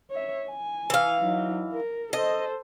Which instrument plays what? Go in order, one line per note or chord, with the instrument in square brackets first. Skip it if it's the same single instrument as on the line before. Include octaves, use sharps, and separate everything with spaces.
[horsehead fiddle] C#5 E5
G#5
[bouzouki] E3 F5
[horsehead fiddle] F#3 D#4
A#4
[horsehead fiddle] A4 C5 [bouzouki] D#5